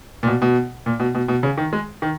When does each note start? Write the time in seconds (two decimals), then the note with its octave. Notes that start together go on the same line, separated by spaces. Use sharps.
0.23 A#2
0.28 B2
0.42 B2
0.86 A#2
1.00 B2
1.15 B2
1.28 B2
1.43 C#3
1.57 D#3
1.73 G#3
2.02 D#3